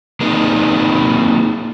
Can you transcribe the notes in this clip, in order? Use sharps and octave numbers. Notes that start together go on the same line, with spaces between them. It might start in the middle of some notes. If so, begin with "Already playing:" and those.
A#3 C4 D4 D#4 G#4 B4